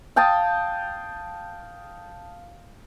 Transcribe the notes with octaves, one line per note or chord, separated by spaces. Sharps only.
F5 G5 A5 D#6